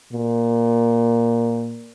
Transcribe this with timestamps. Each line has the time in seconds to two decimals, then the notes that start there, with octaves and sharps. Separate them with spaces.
0.13 A#2